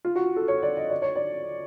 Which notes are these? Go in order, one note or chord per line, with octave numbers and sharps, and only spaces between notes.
F4
F#4
A4
C#5
D5
D#5
D5
C#5
D5